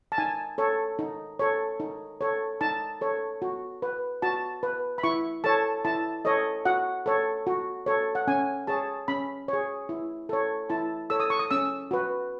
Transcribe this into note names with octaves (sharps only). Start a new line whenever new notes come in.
A5
D#4 G#5
A4 C#5
D#4
A4 C#5
D#4
A4 C#5
D#4 A5
A4 C#5
F#4
B4
F#4 A5
B4
B5
E4 C#6
A4 C#5 A5
E4 A5
A4 C#5 D#5
F#4 F#5
A4 C#5
F#4
A4 C#5
F#5
C#4 G#5
G#4 C#5 A5
C#4 B5
G#4 C#5
E4
A4 C#5
E4 A5
A4 C#5 E6
D#6
C#6
D#6
C#4 E6
F#4 B4